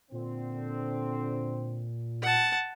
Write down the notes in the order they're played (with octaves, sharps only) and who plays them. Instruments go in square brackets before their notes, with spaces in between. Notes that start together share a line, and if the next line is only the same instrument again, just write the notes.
[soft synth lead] A#2 [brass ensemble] D3 C4
[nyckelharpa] F#5 A5